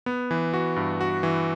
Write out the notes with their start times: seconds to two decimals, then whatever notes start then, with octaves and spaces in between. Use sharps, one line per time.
0.06 B3
0.31 E3
0.54 F#4
0.76 G2
1.01 F#4
1.23 E3